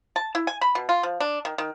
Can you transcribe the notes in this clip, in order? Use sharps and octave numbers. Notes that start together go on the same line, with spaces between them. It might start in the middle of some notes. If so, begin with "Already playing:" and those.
A5
E4
G#5
B5
B2
F4
F3
D4
D#3
D#3